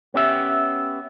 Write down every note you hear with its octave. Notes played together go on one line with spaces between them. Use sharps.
B3 C#4 G4 E5